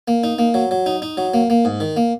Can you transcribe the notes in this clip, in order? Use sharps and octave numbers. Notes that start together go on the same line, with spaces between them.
A#3
D#4
A#3
F#3
F#3
D#4
D#4
F#3
A#3
A#3
G#2
D#3
A#3